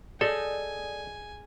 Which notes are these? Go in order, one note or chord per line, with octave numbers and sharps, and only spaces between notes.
G#4 A4 D5 D#5 G#5